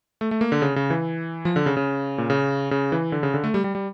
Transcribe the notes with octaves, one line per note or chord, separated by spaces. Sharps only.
A3
A3
A#3
D3
C#3
C#3
E3
F3
D3
C#3
C#3
A#2
C#3
C#3
E3
D3
C#3
D3
A3
G3
G3
G3